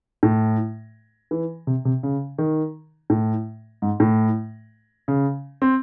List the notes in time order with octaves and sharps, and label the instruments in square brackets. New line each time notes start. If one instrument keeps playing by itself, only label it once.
[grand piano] A2
E3
C3
C3
C#3
D#3
A2
G#2
A2
C#3
C4